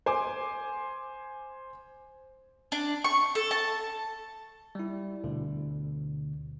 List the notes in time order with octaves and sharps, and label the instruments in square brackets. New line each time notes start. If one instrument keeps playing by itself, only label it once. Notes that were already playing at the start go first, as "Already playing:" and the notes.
[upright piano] C5 G#5 D6
[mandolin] D4
C#6
A4
A5
[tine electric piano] G3 E4
D2 B2 D3